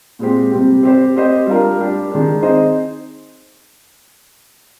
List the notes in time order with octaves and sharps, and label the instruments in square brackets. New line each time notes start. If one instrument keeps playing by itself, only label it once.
[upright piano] A#2 G#3 C4 G4
C3 G3 C4 G4
C4 G4 C5
C4 G4 C5 D#5
G3 D4 F4 A#4
G3 D4 G4
D#3 G#3 D4
C4 D#4 G#4 C5 D#5